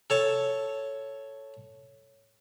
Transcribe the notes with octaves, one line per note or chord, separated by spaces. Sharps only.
A4 C#5 A5